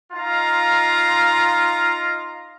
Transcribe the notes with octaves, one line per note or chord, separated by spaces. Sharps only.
D#4 F4 F5 A#5